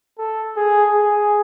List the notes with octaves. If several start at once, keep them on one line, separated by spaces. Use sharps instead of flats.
A4
G#4
G#4